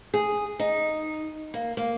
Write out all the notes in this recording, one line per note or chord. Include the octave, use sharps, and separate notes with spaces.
G#4
D#4
A#3
A#3